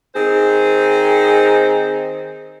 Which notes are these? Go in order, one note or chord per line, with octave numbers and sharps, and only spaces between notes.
D#3 C4 D#4 G#4 C5